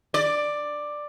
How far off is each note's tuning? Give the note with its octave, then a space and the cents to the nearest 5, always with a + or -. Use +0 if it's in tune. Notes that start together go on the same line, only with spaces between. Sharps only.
D5 +10